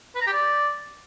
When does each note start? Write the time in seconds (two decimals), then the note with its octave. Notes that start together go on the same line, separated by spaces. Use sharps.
0.15 B4
0.21 A#5
0.27 G4
0.33 D5